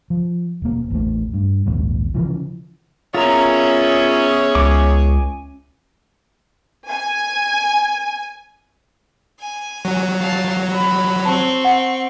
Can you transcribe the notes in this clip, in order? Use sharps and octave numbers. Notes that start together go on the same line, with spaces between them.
F3
E1 A#3
A1 E2 A3
G2
D#1 A#1 D#2 G#2
C#3 E3 F3
B3 C#4 F4 G#4 A#4 C#5 E5 A#5
C#2 G#5 D6
G#5
G#5
F#3
F5 A5
B5
C4 A5 C#6
F#5